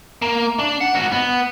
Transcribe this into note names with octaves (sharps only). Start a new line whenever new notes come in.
A#3
D4
F#5
G#2 F#4
B3